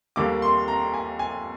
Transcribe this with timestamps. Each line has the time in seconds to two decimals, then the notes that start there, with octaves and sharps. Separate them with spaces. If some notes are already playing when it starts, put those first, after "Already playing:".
0.16 D#2 D3 G3 A#3 D6
0.42 C6
0.68 A#5
0.94 G#5
1.19 G#5